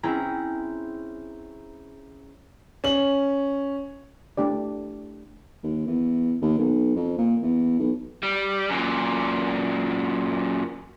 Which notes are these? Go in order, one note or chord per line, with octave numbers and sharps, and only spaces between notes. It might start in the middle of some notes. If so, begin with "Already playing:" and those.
C4 C#4 E4 G#4 G5 A#5
C#4 F#7
A3 D4 G4 D5
D#2
E2
D#2
B1
F2
A#2
E2
B1
G3
F#2 A#2